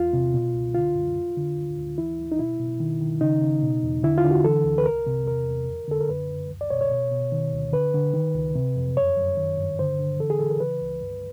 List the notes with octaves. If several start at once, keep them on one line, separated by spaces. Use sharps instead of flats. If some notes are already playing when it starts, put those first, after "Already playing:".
Already playing: E2 F4
C3
B2
C#2
D3 F4
F#2
F2
D3
D2
D2
E3 E4
D2
D#4
B2 E4
B2
D#3
D#3
C#3 D#4
C#3
B2
E2
D3 E4
F4
D3
F#4
E3 A4
D2
B4
C2 A#4
C3
E2 A#4
E2
F2
D3 A4
A#4
F#2 B4
F#2
C#2
D5
B2 C#5
C#5
B2
B2
D#3
D2
D3 B4
D3
D#3
C#2
C3
F2
F#2 C#5
F#2
D#3
G2
D3 C5
D3
E3 A4
G#4
E3 A4
A#4
C#3 B4
C#2
G2